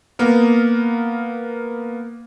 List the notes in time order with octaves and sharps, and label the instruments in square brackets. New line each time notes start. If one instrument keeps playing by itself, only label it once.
[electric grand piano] A#3 B3 A#4